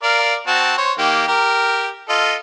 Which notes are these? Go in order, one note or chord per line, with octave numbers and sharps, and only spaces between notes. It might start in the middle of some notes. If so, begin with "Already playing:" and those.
A#4 D5 F5
C4 F#4 A5
C5 C#5
D#3 A#3 G4
G4 A#4
F4 A4 D#5